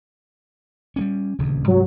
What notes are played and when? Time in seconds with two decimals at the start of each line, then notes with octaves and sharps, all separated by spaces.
0.96 G3 A#3 C#4
1.39 D#1 D2 C#3
1.68 G2 C3 F#3 G#3